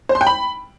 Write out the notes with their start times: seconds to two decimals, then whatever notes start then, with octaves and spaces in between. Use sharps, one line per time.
0.09 C5
0.15 C6
0.21 G5
0.27 B5